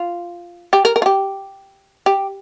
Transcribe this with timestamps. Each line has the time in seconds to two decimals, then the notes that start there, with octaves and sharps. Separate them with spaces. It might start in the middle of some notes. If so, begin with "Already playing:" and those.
Already playing: F4
0.73 G4
0.85 A#4
0.96 A#4
1.02 F4
1.06 G4
2.06 G4